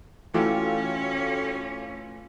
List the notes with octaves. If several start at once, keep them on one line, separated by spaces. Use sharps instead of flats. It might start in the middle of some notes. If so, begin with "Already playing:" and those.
E3 A3 C#4 F4 F#4 A4 F5 G5